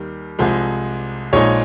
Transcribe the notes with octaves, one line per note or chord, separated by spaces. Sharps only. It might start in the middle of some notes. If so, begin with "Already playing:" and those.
Already playing: D#2 D#3 G3
C2 C3 F3 G#3
A#1 A#2 G#3 D#4 C#5